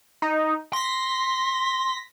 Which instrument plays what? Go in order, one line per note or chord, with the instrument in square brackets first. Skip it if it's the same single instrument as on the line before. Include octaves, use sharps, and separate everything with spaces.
[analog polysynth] D#4
[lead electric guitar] C6 [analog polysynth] A#6 B6